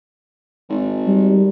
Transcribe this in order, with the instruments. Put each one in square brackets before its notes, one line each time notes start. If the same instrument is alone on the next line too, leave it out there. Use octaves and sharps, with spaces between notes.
[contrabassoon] G#1
[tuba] G3